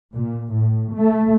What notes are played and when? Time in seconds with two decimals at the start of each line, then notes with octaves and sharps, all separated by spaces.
0.14 A#2
0.53 A2
0.95 A3